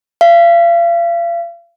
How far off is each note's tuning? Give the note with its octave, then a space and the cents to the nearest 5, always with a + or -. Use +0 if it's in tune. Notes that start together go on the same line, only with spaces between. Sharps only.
F5 -40